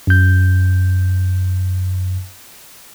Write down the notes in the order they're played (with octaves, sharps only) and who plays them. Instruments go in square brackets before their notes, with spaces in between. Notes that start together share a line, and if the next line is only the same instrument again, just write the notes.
[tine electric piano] F#2 G6